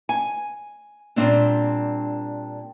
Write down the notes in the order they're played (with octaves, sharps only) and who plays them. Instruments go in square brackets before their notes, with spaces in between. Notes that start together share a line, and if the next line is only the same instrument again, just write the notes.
[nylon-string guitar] G#5
A#2 G3 A3 C4 D4